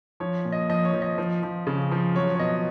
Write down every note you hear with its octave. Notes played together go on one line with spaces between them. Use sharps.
F3 C#5
A#2
D#5
F3 D#5
C#5
F3
D#5
F3
F3
C#3
F3
F#3 C#5
C#5
B2 D#5